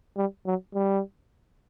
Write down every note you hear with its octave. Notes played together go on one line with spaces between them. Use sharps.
G3
F#3
G3